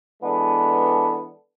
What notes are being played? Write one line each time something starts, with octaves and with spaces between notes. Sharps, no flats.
E3 G#3 B3 D4 A4